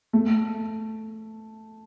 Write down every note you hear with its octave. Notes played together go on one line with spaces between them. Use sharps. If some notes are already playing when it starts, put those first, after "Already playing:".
A3